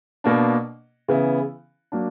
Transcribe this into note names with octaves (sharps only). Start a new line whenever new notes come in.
B2 A#3 D4
C#3 E3 B3 E4
F#3 A#3 D4